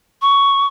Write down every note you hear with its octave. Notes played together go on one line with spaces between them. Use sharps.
C#6